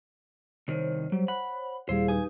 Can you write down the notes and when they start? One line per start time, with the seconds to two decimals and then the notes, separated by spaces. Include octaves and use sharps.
0.68 C2 D#3 C5 C#5
1.12 F#3 G3
1.28 F#5 B5
1.89 D#2 A#2 G3 E4 G#4 C5 F5
2.08 D#4 G4 B4 G#5